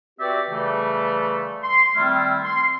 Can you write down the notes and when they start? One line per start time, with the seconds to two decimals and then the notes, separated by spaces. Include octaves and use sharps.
0.19 C4 F#4 G4 B4 D5 E5
0.49 C#3 E3 G3 A3
1.62 C6
1.95 D#3 G3 A3 C4 E4 F4
2.43 C6